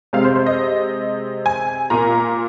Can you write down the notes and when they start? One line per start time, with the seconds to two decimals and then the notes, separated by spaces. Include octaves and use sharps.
0.13 C3 G#3 C4 F5
0.24 C5
0.35 C5
0.46 D#5
1.46 G#5
1.90 A#2 A#3 A#5